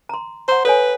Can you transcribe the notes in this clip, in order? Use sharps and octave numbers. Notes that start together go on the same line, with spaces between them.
A#5 C6
C5 F#5 A#5
A4 B4 C#5 G#5